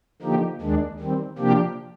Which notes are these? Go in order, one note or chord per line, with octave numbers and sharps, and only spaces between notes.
D3 F3 A#3 D#4 G4
D#2 D#3 G#3 D4
D#3 G3 C4
C3 F3 A#3 D4 G4